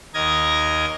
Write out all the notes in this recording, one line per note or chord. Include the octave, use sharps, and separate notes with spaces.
D#2 A#4 D#5 G#6 A#6